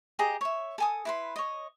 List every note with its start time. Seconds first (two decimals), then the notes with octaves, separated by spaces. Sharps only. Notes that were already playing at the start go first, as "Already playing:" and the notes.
0.19 G4 G#4 D#5 A#5
0.41 C#5 E5
0.78 A4 G#5 D#6
1.05 E4 B4 C6
1.36 C#5 D#5